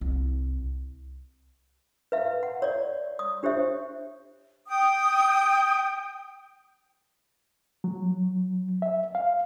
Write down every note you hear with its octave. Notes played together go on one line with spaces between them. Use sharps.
C2
B4 E5 F5
F#5
C#5 D5
D#6
D4 G4 C5 C#5 E5
G5 D#6
F#3
E5
F5